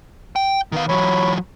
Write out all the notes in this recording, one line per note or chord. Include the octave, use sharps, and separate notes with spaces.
G5
D#3 B3 F5
E3 F#3 C#5 B5